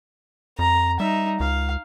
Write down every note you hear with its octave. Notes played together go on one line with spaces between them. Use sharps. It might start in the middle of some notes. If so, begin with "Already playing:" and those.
F2 A#5
G3 D#4 E5
C#2 F5